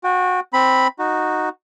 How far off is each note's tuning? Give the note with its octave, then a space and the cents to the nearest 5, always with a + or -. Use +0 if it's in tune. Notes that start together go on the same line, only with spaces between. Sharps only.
F#4 -25 G5 +0
C4 +0 B5 +0
D#4 -5 F#4 -5